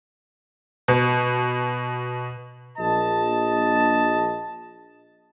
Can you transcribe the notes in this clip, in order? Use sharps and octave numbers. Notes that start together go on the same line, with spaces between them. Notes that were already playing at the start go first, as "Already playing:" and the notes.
B2
A#1 D#5 A5